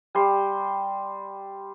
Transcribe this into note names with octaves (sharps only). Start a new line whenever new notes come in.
G3 C6